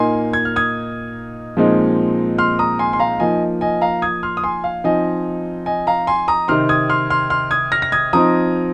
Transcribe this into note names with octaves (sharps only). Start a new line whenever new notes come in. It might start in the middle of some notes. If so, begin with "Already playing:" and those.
Already playing: A#2 A#3 D#4 G#5 C6
G#6
F6
D#6 G#6
A#2 F3 G#3 C4 D#4
C6 F6
A#5 D#6
G#5 C6
C6
F5 A#5
F3 A#3 D#4 D#5 G#5
D#5 G#5
F5 A#5
D#6 G#6
C6 F6
D#6
G#5 C6
F5
F3 C4 D#4 D#5 G#5
D#5 G#5
F5 A#5
G#5 C6
A#5 D#6
C3 D#3 C4 D#4 C6 F6
D#6 G#6
C6 F6
C6 F6
C6 F6
D#6 G#6
F6 A#6
A#6
D#6 G#6
F3 C4 D#4 A#5 D#6